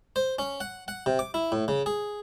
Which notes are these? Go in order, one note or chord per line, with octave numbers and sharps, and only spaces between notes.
C5
C#4
F#5
F#5
C3
D6
E4
A2
C#3
G#4